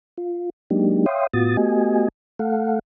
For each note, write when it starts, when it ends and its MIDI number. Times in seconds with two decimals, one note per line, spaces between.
0.18 0.50 65
0.70 1.06 54
0.70 1.06 56
0.70 1.06 58
0.70 1.06 62
0.70 1.06 63
0.70 1.06 67
1.06 1.27 73
1.06 1.27 76
1.06 1.27 77
1.06 1.27 79
1.06 1.27 84
1.06 1.27 87
1.33 1.57 45
1.33 1.57 59
1.33 1.57 65
1.33 1.57 66
1.33 1.57 87
1.33 1.57 93
1.57 2.08 57
1.57 2.08 59
1.57 2.08 66
1.57 2.08 67
1.57 2.08 75
1.57 2.08 80
2.39 2.79 57
2.39 2.79 69
2.39 2.79 77
2.39 2.79 78